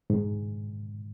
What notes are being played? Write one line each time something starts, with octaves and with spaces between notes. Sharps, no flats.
G#2